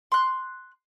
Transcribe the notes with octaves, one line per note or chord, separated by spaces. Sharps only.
C6 F#6